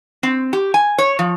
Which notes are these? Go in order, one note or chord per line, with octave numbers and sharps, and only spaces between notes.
C4
G4
G#5
C#5
F3